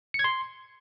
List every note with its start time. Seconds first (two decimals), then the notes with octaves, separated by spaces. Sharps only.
0.14 C#7
0.19 G#6
0.24 C6